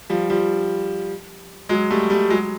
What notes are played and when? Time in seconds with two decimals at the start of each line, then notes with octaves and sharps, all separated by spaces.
0.10 F3 G3
0.30 F3 G3
1.69 F#3 G#3
1.90 G3 A3
2.10 G3 A3
2.30 F#3 G#3